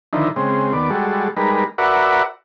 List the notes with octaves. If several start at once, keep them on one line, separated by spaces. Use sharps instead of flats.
D3 D#3 F3 D#4 E4
C#3 G#3 C4
D#2 B3 D5
G3 G#3 F#4 A4
G3 G#3 D#4 A#4 B4
F#4 A#4 B4 D5 E5 F#5